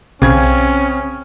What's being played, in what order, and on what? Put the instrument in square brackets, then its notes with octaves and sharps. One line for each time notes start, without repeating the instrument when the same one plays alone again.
[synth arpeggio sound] B1 [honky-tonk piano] C#3 G#6 [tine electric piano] C4 [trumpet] C#4